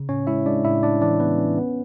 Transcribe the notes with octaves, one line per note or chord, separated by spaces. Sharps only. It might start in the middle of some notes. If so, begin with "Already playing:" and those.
Already playing: C#3
A2 C#4 C#5
G#3 E4 E5
G#3 D4 D5
A2 E4 E5
A2 D4 D5
E3 D4 D5
E3 B3 B4
C#4
B3